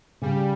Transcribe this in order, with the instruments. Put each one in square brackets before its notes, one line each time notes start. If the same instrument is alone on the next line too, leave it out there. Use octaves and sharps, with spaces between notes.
[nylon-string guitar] C#3 [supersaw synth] G3